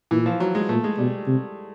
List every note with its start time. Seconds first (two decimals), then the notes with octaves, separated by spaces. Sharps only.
0.11 A#2 E3
0.26 F3
0.40 F#3
0.55 G#3
0.69 A#2 A3
0.84 G#3
0.98 B2 G3
1.27 C3